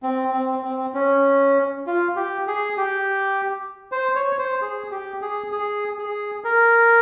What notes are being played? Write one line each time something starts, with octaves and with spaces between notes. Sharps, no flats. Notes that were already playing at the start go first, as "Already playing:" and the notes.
C4
C4
C4
C#4
F4
G4
G#4
G4
C5
C#5
C5
G#4
G4
G#4
G#4
G#4
A#4